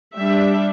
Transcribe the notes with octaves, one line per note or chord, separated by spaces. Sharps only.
G3 D4 E5